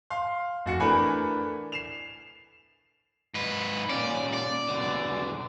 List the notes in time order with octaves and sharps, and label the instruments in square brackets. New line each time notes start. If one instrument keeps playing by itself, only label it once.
[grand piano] F5 C6
F1 F#4 C#7
E3 A3 D4 A#4 G#5 B5
C7 E7 F7
[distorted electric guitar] G#2 B4
[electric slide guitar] A#2 C#4 [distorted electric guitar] D5
[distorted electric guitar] D5
[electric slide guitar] E2 B2 D3